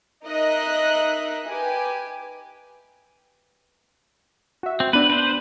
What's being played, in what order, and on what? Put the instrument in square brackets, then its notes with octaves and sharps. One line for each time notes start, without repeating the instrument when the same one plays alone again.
[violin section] D#4 A#4 D#5 E5 F#6
G4 B4 G#5
[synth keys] F#4 E5
[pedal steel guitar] C4
[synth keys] B3 D4 [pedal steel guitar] B4
[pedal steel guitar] B4 C5